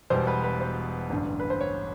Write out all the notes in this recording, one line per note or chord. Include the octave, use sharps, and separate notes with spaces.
E1 E2 B2 G3 C5
B4
B4
C5
A1 G2 D3
B4
C5
C#5